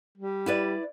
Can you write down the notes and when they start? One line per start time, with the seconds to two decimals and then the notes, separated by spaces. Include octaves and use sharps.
0.18 G3
0.46 E4 B4 D5